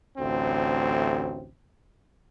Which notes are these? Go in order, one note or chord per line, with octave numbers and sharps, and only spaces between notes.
A1 D2 C4